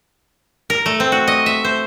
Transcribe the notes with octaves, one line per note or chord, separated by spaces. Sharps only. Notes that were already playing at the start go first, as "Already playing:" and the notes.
A#4
A3
C4
F#4
D#5
E5
C5